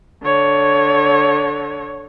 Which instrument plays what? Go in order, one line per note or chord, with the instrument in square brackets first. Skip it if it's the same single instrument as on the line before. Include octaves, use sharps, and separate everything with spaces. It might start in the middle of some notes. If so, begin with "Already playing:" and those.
[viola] D3 C#5